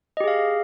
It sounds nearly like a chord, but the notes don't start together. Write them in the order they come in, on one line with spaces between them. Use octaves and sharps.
D#5 G4 G#4 F5